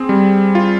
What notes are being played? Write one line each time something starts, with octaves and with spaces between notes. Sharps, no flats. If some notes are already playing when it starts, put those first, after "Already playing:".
Already playing: C4 G#4
G3
F4